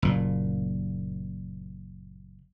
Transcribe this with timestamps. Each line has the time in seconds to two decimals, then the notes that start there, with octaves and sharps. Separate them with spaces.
0.02 F#1 A#2